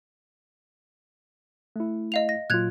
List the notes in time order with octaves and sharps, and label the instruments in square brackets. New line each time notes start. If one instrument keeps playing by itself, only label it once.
[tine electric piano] A3 E4
[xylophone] D#5 F5 F7
A#6
[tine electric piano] A#2 F#3 F4 [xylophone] F#6 G#6 F7